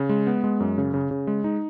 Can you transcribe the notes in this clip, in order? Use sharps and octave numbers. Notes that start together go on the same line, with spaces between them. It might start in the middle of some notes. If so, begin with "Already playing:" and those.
Already playing: C#3
G#3
B3
G#3
F#2
C#3
C#3
C#3
G#3
D#4